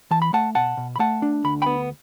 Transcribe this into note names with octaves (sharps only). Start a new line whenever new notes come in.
E3 A5
B5
A3 F#5 A5
B2 F#5 A5
B2
B5
A3 F#5 A5
D4
D2 B5
B3 G5 B5